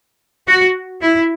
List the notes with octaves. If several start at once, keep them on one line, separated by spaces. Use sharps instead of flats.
F#4
E4